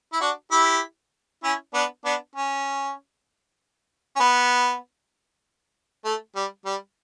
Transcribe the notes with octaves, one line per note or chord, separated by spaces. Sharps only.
E4
D4 F#4
E4 G4
C#4 E4
B3 D4
B3 D4
C#4
C#4
B3
A3
G3
G3